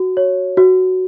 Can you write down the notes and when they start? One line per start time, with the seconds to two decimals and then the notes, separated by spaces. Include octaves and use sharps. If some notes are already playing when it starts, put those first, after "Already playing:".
Already playing: F#4
0.17 C#5
0.57 F#4